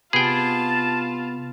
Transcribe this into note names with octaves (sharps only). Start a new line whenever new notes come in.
C3 B3 F4 G#4 G5 A5 B5